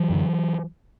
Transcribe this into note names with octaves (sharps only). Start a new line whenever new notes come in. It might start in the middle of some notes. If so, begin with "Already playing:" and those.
Already playing: E3 F#3
F#2 D3